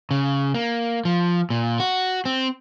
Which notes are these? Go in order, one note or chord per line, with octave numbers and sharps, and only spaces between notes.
C#3
A#3
F3
A#2
F#4
C4